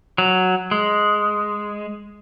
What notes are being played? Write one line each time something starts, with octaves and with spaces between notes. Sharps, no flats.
F#3
G#3